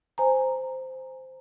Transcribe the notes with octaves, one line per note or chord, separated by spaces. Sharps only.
C5 G#5 A#5